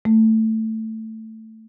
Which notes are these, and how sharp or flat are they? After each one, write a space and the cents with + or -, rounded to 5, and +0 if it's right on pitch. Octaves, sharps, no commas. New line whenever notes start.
A3 +10